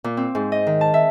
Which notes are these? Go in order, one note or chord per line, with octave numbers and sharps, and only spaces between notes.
A#2
C4
G#2
D#5
D#3
A5
E5